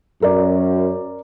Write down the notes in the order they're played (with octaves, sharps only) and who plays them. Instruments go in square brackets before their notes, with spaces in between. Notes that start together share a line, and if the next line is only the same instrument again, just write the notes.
[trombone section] F#2 [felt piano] A#4 D5